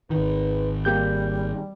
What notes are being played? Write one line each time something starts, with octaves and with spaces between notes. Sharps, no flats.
G#1 D#3 B4
G3 A#3 G4 G6